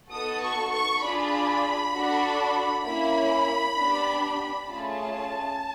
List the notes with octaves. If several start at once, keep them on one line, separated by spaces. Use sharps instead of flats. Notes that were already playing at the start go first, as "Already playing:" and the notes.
B3 D#4 F#4 A4 D#6
C#6
C#6
D4 F4 G#4 B5
D4 F#4 A4
A#3 C#4 E4 B5
B3 D4 G4
A3 C#4 F4 G#4 A5